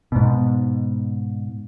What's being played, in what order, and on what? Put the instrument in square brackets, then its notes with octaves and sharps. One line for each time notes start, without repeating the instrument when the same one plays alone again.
[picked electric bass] G#2 B2